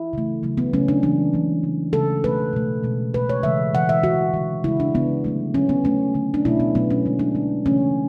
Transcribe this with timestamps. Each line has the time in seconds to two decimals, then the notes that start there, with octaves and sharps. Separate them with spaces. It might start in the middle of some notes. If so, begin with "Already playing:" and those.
Already playing: E4
0.13 C#3 E3 A3
0.43 C#3 F#3 A3
0.57 B3
0.73 C#3 F#3 A3 C#4
0.88 D4
1.03 C#3 E3 G#3 D4
1.33 C#3 E3 G#3
1.63 C#3 G#3
1.93 C#3 G#3 A4
2.24 B2 A3 B4
2.53 B2 A3
2.83 B2 G#3
3.14 B2 G#3 B4
3.29 C#5
3.43 C#3 E3 G#3 E5
3.73 C#3 E3 G#3 F#5
3.89 E5
4.03 D3 G#3 F#4
4.34 D3 G#3
4.64 C#3 G#3 E4
4.80 D4
4.94 C#3 G#3 B3
5.24 D3 F#3 A3
5.54 D3 F#3 A3 C#4
5.69 B3
5.84 D3 A3 C#4
6.14 D3 A3
6.34 D4
6.45 B2 F#3 A3 E4
6.60 B3
6.75 B2 F#3 A3 B3
6.91 C#4
7.06 D3 G#3
7.19 D4
7.35 D3 G#3
7.65 C#3 E3 A3 C#4